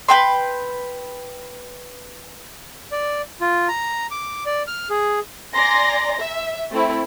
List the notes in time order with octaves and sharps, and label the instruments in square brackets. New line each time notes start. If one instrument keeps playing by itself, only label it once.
[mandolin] B4 G5 C6
[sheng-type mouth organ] D5
F4
A#5
D6
D5
F6
G#4
[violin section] D5 G#5 A#5 C6 A#6
E5
A3 C4 E4